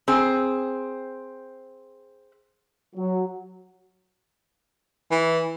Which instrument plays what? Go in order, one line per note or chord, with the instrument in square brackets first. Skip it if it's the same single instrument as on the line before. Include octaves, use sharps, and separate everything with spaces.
[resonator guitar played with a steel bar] C4 G#4
[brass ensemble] F#3
[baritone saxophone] E3